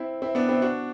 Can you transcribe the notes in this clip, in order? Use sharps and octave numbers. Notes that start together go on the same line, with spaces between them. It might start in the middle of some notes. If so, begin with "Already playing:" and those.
Already playing: C4 E4
C4 E4
B3 D4
C4 E4
D4 F#4